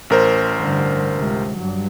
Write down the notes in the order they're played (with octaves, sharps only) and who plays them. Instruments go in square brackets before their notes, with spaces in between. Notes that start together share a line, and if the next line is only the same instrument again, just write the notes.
[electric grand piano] A1 A#4 C5
[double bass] G2 D3
C#2 C3
G2 F#3